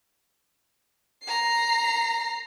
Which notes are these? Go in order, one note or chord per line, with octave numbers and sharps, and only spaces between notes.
A#5 C7